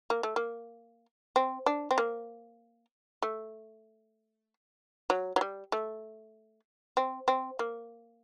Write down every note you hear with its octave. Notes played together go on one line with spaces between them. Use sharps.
A#3
A3
A#3
C4
D4
C4
A#3
A3
F#3
F#3
G3
A3
C4
C4
A#3